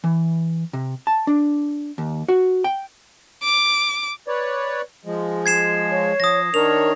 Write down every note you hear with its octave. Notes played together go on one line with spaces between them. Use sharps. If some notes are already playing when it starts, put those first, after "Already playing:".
E3
C3
A5
D4
D#2
F#4
G5
D6
B4 C#5 D5
F3 G#3
G#6 C7 E7
C#5
F3 D#6 A#6
D#3 D4 A#4 C#5 F7